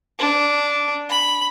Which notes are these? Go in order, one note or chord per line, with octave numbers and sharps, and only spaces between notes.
D4
B5